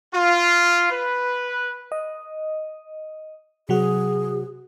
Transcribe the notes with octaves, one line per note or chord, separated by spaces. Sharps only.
F4
B4
D#5
C3 F#3 F#4 G#4